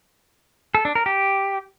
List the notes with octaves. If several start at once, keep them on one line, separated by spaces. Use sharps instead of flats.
A4
D4
A#4
G4